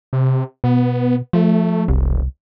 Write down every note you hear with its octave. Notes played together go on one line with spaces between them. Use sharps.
C3
B2 B3
F3 A3
E1 C2